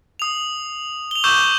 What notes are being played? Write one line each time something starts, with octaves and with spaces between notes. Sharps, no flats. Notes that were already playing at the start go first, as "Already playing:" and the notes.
D#6 F7
F7 G7
C#6 D6 E6 G6 E7